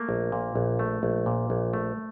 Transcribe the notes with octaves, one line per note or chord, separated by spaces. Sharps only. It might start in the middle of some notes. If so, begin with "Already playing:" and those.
Already playing: A3 A#3
A#1
A#2
A#1
A3
A#1
A#2
A#1
A3